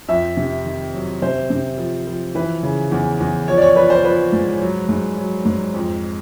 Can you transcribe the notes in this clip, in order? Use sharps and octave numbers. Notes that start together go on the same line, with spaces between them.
F2 E5
C3
D#3
F#3
C3 C5
C3
F3
F3
E3 B4
C#3
E2
E2
F3 C#5
D5
C#5
F3 B4
C5
F3 B4
G#2
F#3
G#2
F#3
G#2
F2